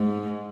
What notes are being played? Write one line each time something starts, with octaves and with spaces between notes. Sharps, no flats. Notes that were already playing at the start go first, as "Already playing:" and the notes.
Already playing: G#2